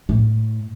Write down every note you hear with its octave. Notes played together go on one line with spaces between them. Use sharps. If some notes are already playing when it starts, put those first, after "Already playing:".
A2